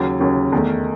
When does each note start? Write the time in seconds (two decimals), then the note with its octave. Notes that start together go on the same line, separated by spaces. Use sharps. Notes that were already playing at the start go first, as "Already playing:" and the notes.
Already playing: D#2 C#3 F#3
0.20 D#2 C#3 F#3
0.52 E2 D#3 A3